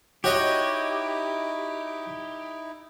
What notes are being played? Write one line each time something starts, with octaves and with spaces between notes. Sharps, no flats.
D#4 E4 F#4 G4 C#5 D#5